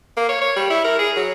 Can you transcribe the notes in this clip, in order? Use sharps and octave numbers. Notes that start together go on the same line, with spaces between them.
A#3
C#5
C#5
G3
E4
A#4
G#4
F#3